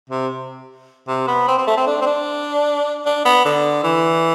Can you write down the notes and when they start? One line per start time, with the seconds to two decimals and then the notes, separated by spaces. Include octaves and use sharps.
0.10 C3
1.08 C3
1.28 B3
1.48 C4
1.58 C4
1.67 A3
1.77 C4
1.87 D4
2.02 C4
2.06 D4
3.06 D4
3.25 B3
3.45 D3
3.84 E3